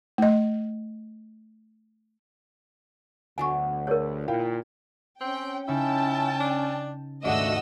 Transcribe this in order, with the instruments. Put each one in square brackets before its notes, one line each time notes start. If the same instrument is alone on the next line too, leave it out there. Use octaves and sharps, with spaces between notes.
[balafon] A3 D#5
[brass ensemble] D2 [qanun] D3 F#3 B3 [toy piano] G#5 C#6
[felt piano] D4 G#4 D5 [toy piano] A#4 C#5
[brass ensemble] A#2 [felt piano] E4 F5 G5
[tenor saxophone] C4 [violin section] C#4 G5
[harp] C#3 D#4 E6 [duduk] C#4 [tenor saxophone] E4 [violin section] G5 A5
[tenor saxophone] D4
[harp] D#1 G#2 [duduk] A3 [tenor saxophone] D4 [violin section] F#4 D#5 E6